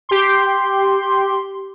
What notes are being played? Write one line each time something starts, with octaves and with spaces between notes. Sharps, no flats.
G4 C6